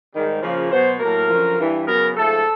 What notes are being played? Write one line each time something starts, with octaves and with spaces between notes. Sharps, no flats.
G#2 D#3 G3
C#3 F3 A#3
B2 F#3 B3 C5
A2 F#3 A#3 A#4
F#2 D3 F3
G2 E3 G3
C#3 F#3 B3 A#4
G#2 F3 A3 A4